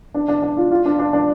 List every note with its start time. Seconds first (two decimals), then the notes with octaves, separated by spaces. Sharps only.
0.14 D4
0.28 D4
0.42 D4
0.57 F4
0.71 F4
0.86 D4
0.99 D4
1.13 D4